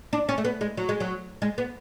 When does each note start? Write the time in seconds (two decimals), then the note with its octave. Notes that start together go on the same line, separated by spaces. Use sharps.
0.13 D4
0.29 C#4
0.38 A3
0.45 B3
0.61 G#3
0.77 F#3
0.89 G#3
1.00 F#3
1.42 G#3
1.58 B3